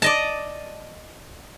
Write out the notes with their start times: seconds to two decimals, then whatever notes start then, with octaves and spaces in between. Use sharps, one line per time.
0.02 D5 D#5 A5